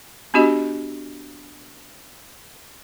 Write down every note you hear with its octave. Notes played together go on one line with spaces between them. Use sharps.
B3 D4 F#4 G4 D#5